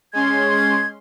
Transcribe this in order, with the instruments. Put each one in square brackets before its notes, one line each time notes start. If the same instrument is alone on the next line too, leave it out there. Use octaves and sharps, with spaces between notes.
[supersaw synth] G#3 C#4 C6 [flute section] G#5 G#6